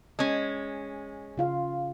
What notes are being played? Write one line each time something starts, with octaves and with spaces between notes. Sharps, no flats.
G#3 C#4
C#3 F4 F5